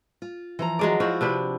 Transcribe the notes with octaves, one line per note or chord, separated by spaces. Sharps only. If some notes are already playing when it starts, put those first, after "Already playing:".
F4
E3 F3 A#5
F#3 G#3 D5
F3 E4 F#4
C3 D4 B4